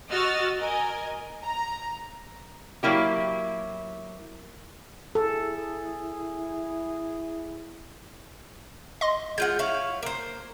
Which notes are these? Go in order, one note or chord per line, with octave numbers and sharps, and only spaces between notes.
F#4 D#5 E6 F6 A6
A#4 D#5 G#5
A#5
F#3 A#3 E4 G4
E4 G#4 A4
D#5 C6
G#3 F4 F#5 G6
E4 C#5 F5
A#3 C5